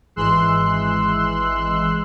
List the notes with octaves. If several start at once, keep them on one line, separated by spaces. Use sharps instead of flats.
G#1 E3 G#3 C6 E6 F#6